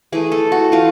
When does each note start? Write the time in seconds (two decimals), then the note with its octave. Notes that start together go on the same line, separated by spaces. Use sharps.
0.12 E3 A3 G#4
0.32 A4
0.52 F#4
0.72 E3 A3 F4